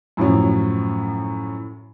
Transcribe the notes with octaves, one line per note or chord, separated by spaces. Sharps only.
F#2 A2 F3 F#3 C#4